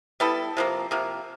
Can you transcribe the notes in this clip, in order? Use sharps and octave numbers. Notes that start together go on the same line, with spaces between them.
G3 B3 E4 A4
C3 F3 A#3
C3 F3 A#3